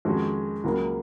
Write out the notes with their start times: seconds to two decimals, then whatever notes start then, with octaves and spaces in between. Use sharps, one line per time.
0.05 F2 D#3 G#3 C#4 F#4
0.64 C#2 C#3 F#3 A#3